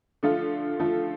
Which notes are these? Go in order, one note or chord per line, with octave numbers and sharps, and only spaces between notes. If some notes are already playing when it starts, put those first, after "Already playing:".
D3 F3 A3 F4 A4
D3 F3 A3 F4 A4